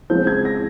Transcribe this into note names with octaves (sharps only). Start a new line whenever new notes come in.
C#3 F3 G#3 C4 G6
G#6
A#6